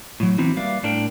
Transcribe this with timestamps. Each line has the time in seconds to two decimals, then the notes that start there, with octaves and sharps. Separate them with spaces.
0.20 A2 F#3
0.38 E3 B3 C4 D#4 E4 F#4
0.56 G3 A#3 B4 D5 E5 F5
0.83 A2 D4 A#4 G5